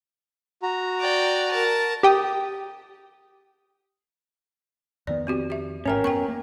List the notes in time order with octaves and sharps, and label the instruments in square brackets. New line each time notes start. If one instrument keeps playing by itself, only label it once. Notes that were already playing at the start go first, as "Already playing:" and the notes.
[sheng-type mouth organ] F#4 A#5
[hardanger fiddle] D5 G5
A#4 A5
[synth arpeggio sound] G4 G5 D#6
[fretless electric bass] F2 D#3 B3 [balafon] D5
[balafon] C4 F#4 G4
G4 E5
[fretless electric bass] A1 G#2 [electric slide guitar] C#4 A#4 [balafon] C#5 E5 G5
[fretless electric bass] F#2 B3 [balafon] G5 A#5 C#6
[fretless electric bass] A#3